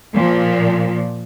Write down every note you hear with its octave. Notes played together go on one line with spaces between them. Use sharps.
A#2 F3